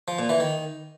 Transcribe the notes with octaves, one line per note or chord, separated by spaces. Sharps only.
F3
A#2
E3
D#3